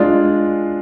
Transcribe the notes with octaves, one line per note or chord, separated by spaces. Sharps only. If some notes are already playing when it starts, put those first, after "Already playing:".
Already playing: G#3 D4 F4